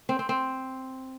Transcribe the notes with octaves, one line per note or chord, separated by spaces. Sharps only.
C4
C4
C4